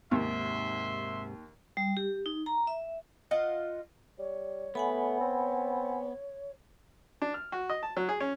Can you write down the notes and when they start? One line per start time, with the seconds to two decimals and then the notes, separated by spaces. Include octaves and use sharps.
0.11 D#2 G#2 C3 E5 C6
1.77 G3
1.97 G4
2.26 D#4
2.46 A#5
2.67 E5
3.31 F4 D#5 F#5
4.19 G3 C#5
4.75 A3 B3 F#5 G#5 B5
5.20 C4
7.22 D4
7.34 F6
7.52 F#4
7.70 D#5
7.83 A5
7.97 F#3
8.09 G#4
8.20 C#4